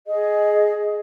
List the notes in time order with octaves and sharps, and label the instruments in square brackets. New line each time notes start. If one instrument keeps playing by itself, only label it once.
[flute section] G#4 D#5